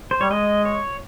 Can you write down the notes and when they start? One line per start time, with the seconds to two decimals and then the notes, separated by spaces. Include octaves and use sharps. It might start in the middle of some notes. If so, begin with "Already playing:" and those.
0.11 C5
0.21 G3 C#5
0.31 G#3 D#5
0.65 C#5